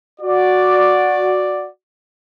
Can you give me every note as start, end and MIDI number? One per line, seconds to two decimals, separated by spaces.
0.21 1.68 66
0.21 1.68 74